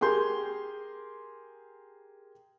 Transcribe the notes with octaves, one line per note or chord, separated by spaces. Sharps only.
G4 G#4 A#4 C6 G6